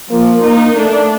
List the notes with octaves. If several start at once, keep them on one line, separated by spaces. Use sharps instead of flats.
F3 A#3
A#3 D#4
A3 D4